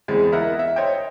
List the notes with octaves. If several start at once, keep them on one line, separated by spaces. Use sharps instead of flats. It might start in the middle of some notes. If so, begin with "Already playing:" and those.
E2 G#3 C4
E4 A#4 D#5 E5 F#5
E5
C5 C#5 D#5 G5